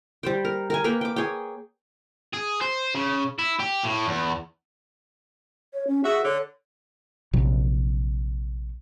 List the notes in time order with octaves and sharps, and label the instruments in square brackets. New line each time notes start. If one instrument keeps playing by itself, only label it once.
[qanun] G3 C5 G5
A#4
A#4 G5 G#5
A#3 A#4 B4 G5
G5 D6
G#4 C#5 G5
[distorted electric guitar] G#4
C5
C#3
E4
G4
A2
E2
[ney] C#5
C#4
[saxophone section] F#4 E5 [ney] G#4
[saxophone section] D3 [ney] C#5
[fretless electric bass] A#1 C3 F#3